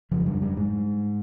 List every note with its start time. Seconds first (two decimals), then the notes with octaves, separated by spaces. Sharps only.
0.11 F2 C#3 F3
0.26 G2 G3
0.41 G2 G3
0.57 G#2 G#3